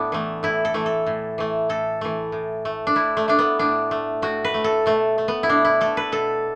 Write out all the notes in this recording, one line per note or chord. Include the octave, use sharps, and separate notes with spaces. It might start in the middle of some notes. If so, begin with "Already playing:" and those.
Already playing: A2 B3 D4
E3 A3
A2 E4
A4
E3 A3
A4
A2
E3 A3
A2 A4
E3 A3
A2
A3
D4
A2 E4
A3
A3 D4
B3
A2 D4
A3
A2 F#4
B4
A3
A4
B2 A3
A3
B3
E4
B2 D4
E4
A3 A4
B4
B2 A4